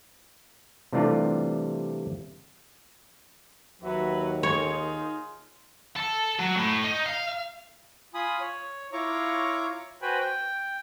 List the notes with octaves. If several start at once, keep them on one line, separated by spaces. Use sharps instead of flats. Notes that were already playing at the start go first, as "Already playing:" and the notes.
C3 E3 G3 A3 D4 F4
D#2 F#3 F#4 B4 E5
D#4 F4 G#4 C#5 C6
A4
F#3
A2
D#4
F5
F4 G#5 B5 D#6
C#5
E4 F4 C#5 A#5 C#6 D6
F#4 B4 C5 G5 G#5 B5
G5